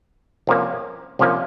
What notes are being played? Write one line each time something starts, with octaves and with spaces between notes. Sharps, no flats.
C2 C3 F3 A#3 C#4
C2 C3 F3 A#3 C#4